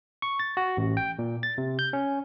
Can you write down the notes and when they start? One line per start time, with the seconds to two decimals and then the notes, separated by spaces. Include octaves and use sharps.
0.22 C#6
0.40 A6
0.57 F#4
0.77 A1
0.97 G5
1.19 A#2
1.43 A6
1.58 C3
1.79 G6
1.93 C#4